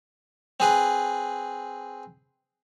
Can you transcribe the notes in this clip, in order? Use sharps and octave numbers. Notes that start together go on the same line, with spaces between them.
C4 G#4 B4